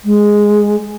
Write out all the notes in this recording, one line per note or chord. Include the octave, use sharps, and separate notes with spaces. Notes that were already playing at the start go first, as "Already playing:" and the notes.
G#3